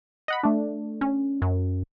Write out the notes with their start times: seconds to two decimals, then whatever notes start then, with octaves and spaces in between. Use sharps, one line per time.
0.28 D#5 F#5 B5
0.43 A3 D4
1.01 C#4
1.42 F#2